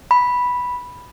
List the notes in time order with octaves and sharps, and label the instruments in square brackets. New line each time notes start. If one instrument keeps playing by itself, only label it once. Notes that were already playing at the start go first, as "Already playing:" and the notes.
[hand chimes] B5